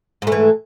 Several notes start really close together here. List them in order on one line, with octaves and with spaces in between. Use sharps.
G#2 A3 E3